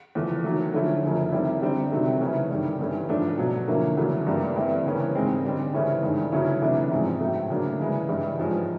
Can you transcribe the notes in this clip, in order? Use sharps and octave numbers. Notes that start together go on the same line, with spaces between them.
E2 C#3 F3 A3
D#3 F#3 A3
D3 F3 A3 C#4 E4
F#2 C#3 F3
D#3 G3 C4 E4
D3 G3 C4 D#4
C3 D#3 F#3 A3 C4
C#3 E3 A3 C#4
G2 D#3 G3
G2 E3 A3 C#4
G#2 F3 A3 D4
B2 F#3 A3
D3 F3 A#3 C#4 E4
E2 C#3 F#3 A3
G2 E3 G3 A#3
G2 E3 A3 C4
C#3 E3 G3 A#3 C#4
G#2 D#3 G#3 C4
D3 G3 C4
C#3 E3 A3 C#4 E4
G2 D#3 G#3
C#3 F#3 A3 C#4 E4
E2 C3 E3 A3 D4
G#2 F3 G#3 C4
A2 F#3 A3
C#3 F#3 A#3 D4
C#3 E3 G#3
G2 E3 G3
G#2 F3 G#3 C#4